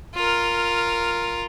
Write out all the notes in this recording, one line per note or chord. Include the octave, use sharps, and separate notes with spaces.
F4 A#4